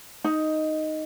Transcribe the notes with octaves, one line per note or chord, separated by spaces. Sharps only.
D#4